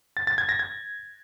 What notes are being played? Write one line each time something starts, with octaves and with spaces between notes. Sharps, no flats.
A6
A6
G#6
A#6
G#6